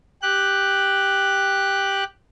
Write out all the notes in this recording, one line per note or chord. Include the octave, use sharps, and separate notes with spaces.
G4 F#6